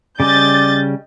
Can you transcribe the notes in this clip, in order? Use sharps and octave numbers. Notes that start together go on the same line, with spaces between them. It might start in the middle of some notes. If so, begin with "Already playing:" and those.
C#3 G3 C#4 D5 D#5 G6 A6